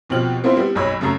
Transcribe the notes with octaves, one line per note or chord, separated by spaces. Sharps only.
D#2 B2 F3 C4 F6 F#7
B3 C4 E4 F4 B4 C5
G3 B3 E4
F#1 B1 F#3 C#5 B5 E6
F#2 C#3 A3 A#5 C7